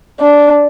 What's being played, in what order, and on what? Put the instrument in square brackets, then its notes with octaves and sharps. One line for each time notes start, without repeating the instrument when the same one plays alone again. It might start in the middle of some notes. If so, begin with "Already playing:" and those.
[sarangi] D4